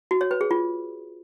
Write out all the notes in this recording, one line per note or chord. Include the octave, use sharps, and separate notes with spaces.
F#4
C#5
B4
G#4
F4